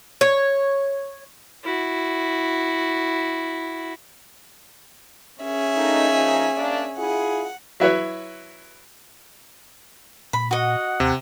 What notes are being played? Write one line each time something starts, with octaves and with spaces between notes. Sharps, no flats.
C#5
E4 F#4
C#4 G#4 E5
A3 A#3 D#4
F3 A#3 D#4
A#3 D4
E4 F4 G#4 F#5
F#3 E4 B4 C#5
A#2 B5
F#4 D#5 F#5
D#2 C3